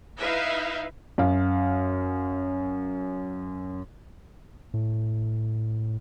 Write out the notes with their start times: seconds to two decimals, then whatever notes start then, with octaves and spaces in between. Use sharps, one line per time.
0.17 D#4 E4 B4 E5 F5
1.18 F#2 F5
4.74 A2